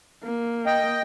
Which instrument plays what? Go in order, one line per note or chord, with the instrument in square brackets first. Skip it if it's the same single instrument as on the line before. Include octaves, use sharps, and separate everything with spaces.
[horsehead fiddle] A#3
[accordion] D#5 G5